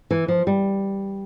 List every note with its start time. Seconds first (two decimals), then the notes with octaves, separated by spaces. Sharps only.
0.11 E3
0.28 F3
0.47 G3